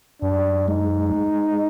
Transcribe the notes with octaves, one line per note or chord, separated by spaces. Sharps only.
F#2 D4
G#3 D#4
G#3